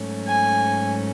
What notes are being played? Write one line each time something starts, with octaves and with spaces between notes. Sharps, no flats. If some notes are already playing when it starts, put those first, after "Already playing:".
Already playing: G#2 F#3 A3 C#4
G#5